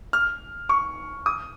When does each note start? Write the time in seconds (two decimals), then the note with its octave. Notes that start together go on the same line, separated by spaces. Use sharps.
0.13 F6
0.69 C#6
1.26 D#6